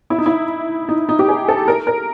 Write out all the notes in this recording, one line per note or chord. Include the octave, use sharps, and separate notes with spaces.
E4
D#4
E4
D#4
D#4
G4
G#4
A4
A#4
A#4